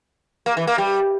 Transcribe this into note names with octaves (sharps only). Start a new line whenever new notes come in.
A#3
E3
A#3
G3